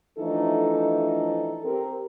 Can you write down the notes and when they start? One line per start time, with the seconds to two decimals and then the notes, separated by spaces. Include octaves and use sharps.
0.18 E3 F3 A3 D4 D#4 A4
1.65 C4 G4 A#4